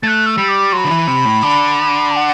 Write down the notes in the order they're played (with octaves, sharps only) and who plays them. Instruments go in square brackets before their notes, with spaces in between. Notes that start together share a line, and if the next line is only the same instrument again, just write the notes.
[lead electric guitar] A3 [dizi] F#6 A6
[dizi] E6
[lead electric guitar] G3
[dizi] D6
[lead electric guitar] F#3 [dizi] C6
[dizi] B5
[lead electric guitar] D3
E3
C3
A2
D3
[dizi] A5
F#5